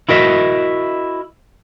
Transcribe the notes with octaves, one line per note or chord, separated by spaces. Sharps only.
E4 F#4 A#4 D#5 E5